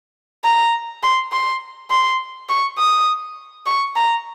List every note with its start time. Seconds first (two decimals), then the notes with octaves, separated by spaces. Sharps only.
0.44 A#5
1.03 C6
1.32 C6
1.90 C6
2.49 C#6
2.78 D#6
3.66 C#6
3.96 A#5